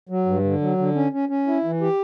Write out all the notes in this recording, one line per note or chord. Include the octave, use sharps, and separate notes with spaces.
F#3
G2
D3
F#3
D3
C#4
C#4
C#4
E4
E3
G4